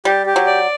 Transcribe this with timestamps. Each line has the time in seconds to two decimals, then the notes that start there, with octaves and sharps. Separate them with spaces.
0.05 G3 G4
0.26 G4
0.36 F#3
0.46 D5